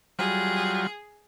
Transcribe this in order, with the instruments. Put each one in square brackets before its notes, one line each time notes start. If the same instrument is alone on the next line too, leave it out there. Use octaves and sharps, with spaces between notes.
[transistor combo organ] F#3 G3 F4 [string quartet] G#4